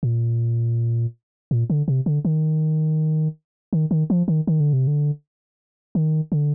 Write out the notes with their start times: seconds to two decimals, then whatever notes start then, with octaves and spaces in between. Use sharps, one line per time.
0.03 A#2
1.51 A#2
1.70 D3
1.88 C3
2.06 D3
2.25 D#3
3.73 D#3
3.91 D#3
4.10 F3
4.28 D#3
4.47 D#3
4.60 D3
4.73 C3
4.87 D3
5.95 D#3
6.32 D3